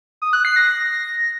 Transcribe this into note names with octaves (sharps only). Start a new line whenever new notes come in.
D#6
F#6
C7
A#6